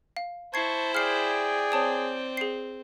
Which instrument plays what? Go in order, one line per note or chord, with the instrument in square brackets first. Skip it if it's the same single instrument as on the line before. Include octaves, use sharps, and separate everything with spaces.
[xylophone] F5
[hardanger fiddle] E4 C5 [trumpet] A5 [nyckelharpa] C#6 [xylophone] G#6 C7
[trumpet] G#4 [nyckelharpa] D5 G5 [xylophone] F6 C7
[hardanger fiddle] C4 [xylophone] C#5 A5 D#6
[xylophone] G#4 C7